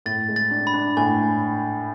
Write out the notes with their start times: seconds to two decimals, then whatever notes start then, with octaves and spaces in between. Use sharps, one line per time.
0.06 A2 A6
0.28 G#3
0.36 A6
0.51 D4
0.67 B5
0.74 D4
0.97 A2 G#5